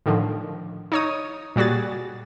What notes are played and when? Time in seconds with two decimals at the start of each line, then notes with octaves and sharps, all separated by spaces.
0.06 A2 D3 D#3 F3
0.92 D#4 C#5 D#6
1.56 A#2 G3 F#4 G#4 A6